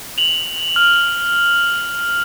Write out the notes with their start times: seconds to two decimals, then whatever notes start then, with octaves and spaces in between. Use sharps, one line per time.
0.18 F7 F#7
0.76 F6